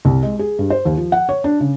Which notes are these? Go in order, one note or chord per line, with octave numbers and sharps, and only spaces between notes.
C2
G#3
G#4
G2
C5
D#2
F3
F#5
C#5
D4
C#3